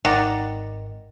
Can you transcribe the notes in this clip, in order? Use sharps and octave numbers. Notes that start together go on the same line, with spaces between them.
G#1 D#3 D5 F#5 A#5